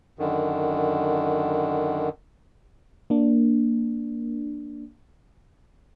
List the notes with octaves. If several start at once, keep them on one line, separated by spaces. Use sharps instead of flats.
F#2 D3 D#3
A#3 D4